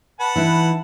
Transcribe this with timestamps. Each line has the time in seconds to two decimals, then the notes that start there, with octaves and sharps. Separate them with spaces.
0.20 B4 F#5 A5
0.36 E3 D#4 E4